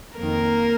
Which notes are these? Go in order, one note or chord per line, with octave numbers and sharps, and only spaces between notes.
F2 D#3 A#3 A#4